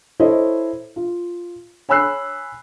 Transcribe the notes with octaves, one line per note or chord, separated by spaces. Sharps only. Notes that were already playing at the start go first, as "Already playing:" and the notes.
E4 A4 C5 C#5 D#5
F4
C#5 G#5 B5 E6 F#6 C7